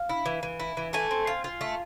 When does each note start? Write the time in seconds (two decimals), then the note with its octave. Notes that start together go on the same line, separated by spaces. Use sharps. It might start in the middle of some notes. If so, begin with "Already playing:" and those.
Already playing: F5
0.09 E4
0.26 E3
0.43 E3
0.60 E4
0.77 E3
0.93 A3 G#5
1.11 C4
1.27 F4
1.44 F4
1.61 A3